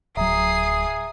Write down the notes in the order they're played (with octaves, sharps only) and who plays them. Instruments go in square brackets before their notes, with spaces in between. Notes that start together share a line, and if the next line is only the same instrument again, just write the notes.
[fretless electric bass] D1 F#3 [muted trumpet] G#4 [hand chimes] E5 A#5 [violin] D#6 C7